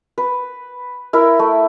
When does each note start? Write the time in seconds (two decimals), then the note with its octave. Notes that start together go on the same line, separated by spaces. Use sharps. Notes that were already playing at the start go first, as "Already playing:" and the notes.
0.18 B4
1.13 E4 A#4 E5
1.39 A3